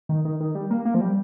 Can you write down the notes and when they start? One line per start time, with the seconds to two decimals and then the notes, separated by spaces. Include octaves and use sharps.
0.09 D#3
0.25 D#3
0.40 D#3
0.55 G3
0.71 A#3
0.85 A#3
0.94 F3
1.01 G3